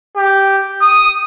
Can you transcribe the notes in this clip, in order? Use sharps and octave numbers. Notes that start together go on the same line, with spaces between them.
G4
D#6